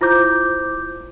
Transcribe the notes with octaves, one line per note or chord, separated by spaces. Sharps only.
E4 F4 C5 D6 G6